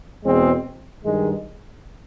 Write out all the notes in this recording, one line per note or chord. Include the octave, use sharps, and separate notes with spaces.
E2 B2 G#3 C4
G2 D#3 G#3